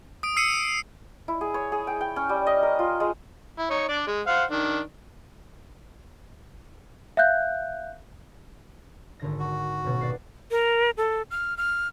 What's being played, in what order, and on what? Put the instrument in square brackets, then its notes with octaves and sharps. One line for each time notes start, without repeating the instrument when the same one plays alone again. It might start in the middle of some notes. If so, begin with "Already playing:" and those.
[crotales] D#6 D7
E6 C7 C#7 D#7
[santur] E4
G#4
C#5
G#4
G5
G5
C#4
G3
D#5
A#4
F4
G#3
[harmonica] E4
D#4 C#5
D4 D5
G#3
C5 F5 F#5
D#3 D4
[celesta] E5 F5 F#6 G6
[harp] G#1 D3 A#6
[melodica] F#4
[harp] D#1 B2
D5 F#6 C7
[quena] A#4
A4
F6
F6